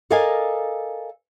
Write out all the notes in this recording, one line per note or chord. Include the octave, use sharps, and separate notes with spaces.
A4 A#4 D5 D#5 F5 G#5